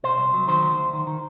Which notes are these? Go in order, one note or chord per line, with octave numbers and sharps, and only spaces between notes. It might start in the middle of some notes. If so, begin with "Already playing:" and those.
B2 C5
C2
F#3
D#3 C5
D2
D2
D#3
D#3